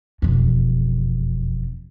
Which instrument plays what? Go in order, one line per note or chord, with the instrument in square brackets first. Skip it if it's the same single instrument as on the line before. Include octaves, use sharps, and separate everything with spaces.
[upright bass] E1 F2